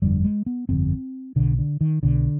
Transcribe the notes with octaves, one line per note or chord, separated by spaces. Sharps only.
G1 F2 D3 G3
G#3
B3
G1 F2 D3 C4
B1 B2 D3
D3
D#3
B1 B2 D3